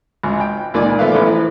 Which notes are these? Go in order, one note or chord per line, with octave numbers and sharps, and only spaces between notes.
G#1 C#2
G5
C#2 A#2 D#3 D5 D6
F3 A3 B3 E5 F5 F#6
A1 A2 B3 C5 D6
E3